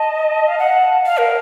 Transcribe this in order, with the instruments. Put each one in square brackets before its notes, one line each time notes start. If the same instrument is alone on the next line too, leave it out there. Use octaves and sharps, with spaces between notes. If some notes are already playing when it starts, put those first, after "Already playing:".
Already playing: [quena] D#5 [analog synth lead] A5
[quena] F5
F#5
F5
A#4